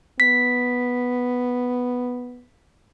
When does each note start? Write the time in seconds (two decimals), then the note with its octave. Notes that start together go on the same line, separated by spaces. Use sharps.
0.20 B3 B6